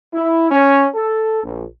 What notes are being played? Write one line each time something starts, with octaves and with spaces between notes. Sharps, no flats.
E4
C#4
A4
A#1